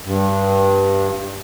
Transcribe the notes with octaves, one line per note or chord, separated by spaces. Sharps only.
G2